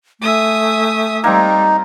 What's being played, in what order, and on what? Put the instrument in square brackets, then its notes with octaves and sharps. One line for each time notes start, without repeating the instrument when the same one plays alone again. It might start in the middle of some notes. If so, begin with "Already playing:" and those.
[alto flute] A3 [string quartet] E5 G#5 D#6
[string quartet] G3 [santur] A#3 C4 [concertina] D#4